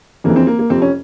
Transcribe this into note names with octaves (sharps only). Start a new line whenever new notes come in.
F2 C#3 E3 A#3
C4
A#3
A#3
F2 C3 F3 C4
C#4